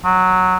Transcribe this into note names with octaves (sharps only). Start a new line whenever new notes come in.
F#3